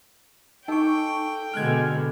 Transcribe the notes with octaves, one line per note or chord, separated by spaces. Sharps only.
D#4 A4 G5 C#6 D6
B2 D3 G#3 F6 F#6 G#6